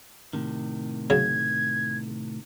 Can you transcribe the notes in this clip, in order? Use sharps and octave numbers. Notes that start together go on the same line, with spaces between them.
A2 C3 D#3
C#3 F#3 G#6